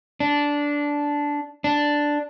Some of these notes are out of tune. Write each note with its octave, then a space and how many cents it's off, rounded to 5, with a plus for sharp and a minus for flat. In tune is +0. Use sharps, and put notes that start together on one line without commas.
D4 -10
D4 +0